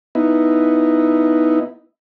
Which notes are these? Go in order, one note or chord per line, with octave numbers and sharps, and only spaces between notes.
B3 D#4 E4